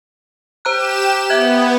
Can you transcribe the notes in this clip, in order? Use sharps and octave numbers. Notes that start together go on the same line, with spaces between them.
G4 C5 A#5 F#6 E7
B3 E5 F#6 G#6